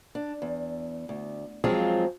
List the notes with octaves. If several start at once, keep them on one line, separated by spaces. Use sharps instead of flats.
D4
E2
D2
F3 F#3 G#3 C4 F4 G#4